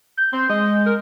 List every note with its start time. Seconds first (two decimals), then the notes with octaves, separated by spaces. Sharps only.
0.17 G6
0.33 C4 C6
0.49 G#3 D#5
0.86 A#4